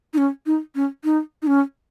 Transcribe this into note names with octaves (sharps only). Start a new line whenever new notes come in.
D#4
C#4
D#4
C#4
D#4
D#4
C#4